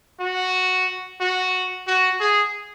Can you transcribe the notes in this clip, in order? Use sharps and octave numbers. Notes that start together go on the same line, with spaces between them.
F#4
F#4
F#4
G#4